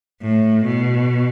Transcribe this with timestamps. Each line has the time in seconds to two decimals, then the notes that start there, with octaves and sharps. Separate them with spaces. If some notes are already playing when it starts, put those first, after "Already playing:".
0.22 A2
0.65 B2